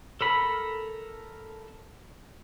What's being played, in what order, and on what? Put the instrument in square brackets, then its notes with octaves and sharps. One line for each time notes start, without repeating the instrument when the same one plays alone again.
[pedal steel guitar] A4 A#4 B5